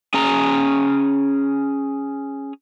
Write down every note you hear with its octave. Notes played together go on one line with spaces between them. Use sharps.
C#4 G#4 A#5